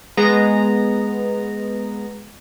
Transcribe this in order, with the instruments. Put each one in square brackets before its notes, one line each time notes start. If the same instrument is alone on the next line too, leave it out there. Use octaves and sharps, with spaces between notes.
[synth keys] G#3 B3 A#5